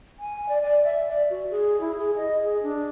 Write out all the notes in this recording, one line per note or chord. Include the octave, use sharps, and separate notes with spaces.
G#5
D5
D5
E5
D5
F#4
G#4
E4
G#4
D#5
G#4
D4